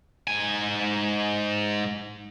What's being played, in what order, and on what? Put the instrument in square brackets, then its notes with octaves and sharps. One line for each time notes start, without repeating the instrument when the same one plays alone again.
[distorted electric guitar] G#2 G#5